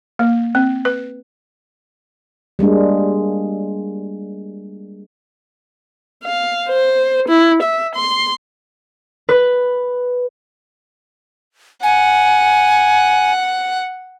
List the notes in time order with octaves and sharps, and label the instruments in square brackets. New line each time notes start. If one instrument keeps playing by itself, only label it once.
[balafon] A#3
C4
B4
[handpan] G3 G#3 A#3 D4
[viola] F5
C5
E4
E5
C6
[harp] B4
[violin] F#5 [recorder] G#5